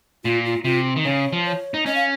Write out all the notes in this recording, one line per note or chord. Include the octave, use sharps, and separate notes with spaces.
A#2 F4
F4
C3 F4
D#3
C#3 C#5
F3
C#5
D#4
C#4 D#5
F5